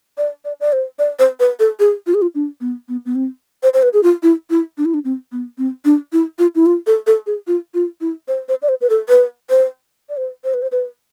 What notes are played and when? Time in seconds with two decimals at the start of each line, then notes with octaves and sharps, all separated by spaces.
0.18 D5
0.45 D5
0.60 D5
0.73 C5
0.99 D5
1.19 C5
1.40 B4
1.60 A4
1.80 G#4
2.07 F4
2.14 G#4
2.22 F4
2.35 D4
2.61 B3
2.89 B3
3.06 B3
3.15 C4
3.63 C5
3.74 C5
3.83 B4
3.93 G#4
4.03 F4
4.23 E4
4.50 E4
4.78 D4
4.85 E4
4.94 D4
5.05 C4
5.32 B3
5.58 C4
5.85 D4
6.13 E4
6.39 F4
6.55 E4
6.66 F4
6.87 A4
7.07 A4
7.27 G#4
7.47 F4
7.74 F4
8.01 E4
8.28 C5
8.49 C5
8.62 D5
8.69 C5
8.81 B4
8.90 A4
9.09 B4
9.50 C5
10.09 D5
10.17 C5
10.44 C5
10.54 B4
10.62 C5
10.72 B4